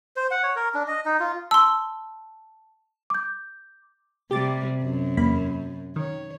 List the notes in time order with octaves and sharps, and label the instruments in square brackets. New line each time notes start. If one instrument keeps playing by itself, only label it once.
[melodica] C5
F#5
C#5
A#4
D4
D#5
D#4
F4
[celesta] A5 [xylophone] C6 E6
[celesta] D6 G6
[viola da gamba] C3 G3 [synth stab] G4 D6 A6
[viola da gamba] F#2
[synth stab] E2 A#3 B5
[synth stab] D#3 [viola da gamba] C#5